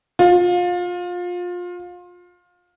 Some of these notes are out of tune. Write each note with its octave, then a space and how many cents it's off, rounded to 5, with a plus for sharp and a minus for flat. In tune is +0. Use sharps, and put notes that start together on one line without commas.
F4 +25